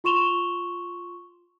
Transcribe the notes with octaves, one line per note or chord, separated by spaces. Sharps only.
F4 C6 C#6 E7 F7 G7